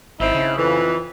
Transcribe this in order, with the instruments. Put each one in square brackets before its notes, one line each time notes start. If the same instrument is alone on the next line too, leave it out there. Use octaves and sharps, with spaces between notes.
[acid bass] G#1 [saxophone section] C4 D#4 E4
[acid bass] C#3
[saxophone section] F2 E3